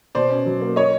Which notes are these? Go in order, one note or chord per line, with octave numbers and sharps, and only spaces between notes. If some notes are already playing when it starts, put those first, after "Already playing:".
B2 C5 D5
C#4
F#3
A#3
C#5 D#5